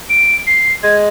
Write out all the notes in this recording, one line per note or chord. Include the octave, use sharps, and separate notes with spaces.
D7
C7
G#3 G#6